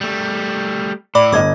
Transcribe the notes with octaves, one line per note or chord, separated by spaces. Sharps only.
G3 A3
A2 D5 B5 D6
G1 D#5 D6 G#6